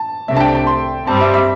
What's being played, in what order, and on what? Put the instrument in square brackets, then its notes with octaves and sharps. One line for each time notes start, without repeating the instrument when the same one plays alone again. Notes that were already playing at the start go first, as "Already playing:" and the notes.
Already playing: [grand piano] A5
[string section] C2 C3 A3 D4 [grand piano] E5
[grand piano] A5
G5
A5
C6
[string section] G2 G3 C4 [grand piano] A5
[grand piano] E5
E5